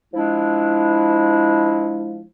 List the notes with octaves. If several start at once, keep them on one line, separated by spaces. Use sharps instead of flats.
F3 G#3 D4 E4